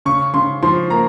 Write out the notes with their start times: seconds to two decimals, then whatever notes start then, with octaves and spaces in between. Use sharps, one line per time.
0.05 C#3 C#6
0.34 C#3 C6
0.63 F3 C6
0.90 A#3 A#5